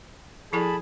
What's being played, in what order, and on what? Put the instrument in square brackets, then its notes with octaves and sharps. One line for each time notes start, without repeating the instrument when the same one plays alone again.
[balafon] F3 E4 A4 [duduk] G#4 [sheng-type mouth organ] A5 B5